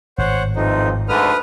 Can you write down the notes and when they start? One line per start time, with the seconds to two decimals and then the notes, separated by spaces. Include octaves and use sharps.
0.18 G#1 A2 C5 C#5 F#5
0.56 A1 F2 D#4 C5
1.09 D2 G#2 D3 B4 D#6 F6